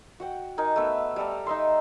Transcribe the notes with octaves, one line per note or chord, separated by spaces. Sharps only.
F#4 F#5 G5
D#4 A#4 G#5
A3 B3 B4 E5
G3 A4 A#5
D#4 D#5 E5 C6